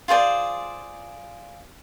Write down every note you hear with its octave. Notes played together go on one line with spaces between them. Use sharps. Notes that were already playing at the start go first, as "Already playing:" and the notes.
F4 G#4 C5 D5